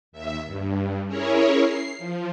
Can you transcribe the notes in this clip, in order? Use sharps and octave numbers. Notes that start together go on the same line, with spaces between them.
D#2 E5
G2
C#4 E4 G#4 A#4 C#5
C7
F3